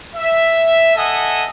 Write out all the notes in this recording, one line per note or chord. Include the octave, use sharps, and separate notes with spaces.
E5
A4 D#5 E5 F#5 G#5 D#6